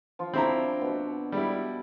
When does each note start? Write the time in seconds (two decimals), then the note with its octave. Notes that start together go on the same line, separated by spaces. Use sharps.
0.19 F3 F4
0.34 C4 D4 E4 A#5 C#6
0.81 B2 F#4
1.32 G3 E4